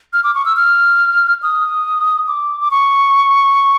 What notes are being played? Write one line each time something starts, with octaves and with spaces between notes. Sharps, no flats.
F6
D6
C#6
E6
F6
D#6
D6
D6
C#6